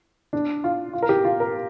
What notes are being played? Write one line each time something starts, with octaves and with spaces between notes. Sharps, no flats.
D4
F4
F4
A#4
G4
F4
A#4